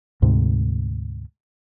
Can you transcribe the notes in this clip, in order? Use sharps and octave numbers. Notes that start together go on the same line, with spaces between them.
D2 G#2 C3